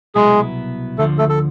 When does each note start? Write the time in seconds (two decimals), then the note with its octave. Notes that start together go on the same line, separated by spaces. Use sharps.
0.15 C2 B2 F#3 G#3 B3 E4 G#4
0.98 D2 D3 F3 A3 A4
1.18 A3 A4
1.29 A4